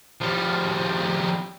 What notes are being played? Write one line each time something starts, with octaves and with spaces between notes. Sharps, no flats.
F3 G3